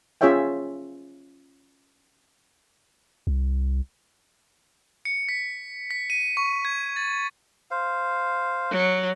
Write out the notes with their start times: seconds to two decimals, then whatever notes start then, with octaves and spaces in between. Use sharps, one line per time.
0.21 C#4 F4 G#4 C#5 E5 G5
3.27 C2
5.05 C#7
5.29 B6
5.91 B6
6.10 D#7
6.37 C#6
6.65 G#6
6.96 A6
7.71 C5 F5
8.71 F#3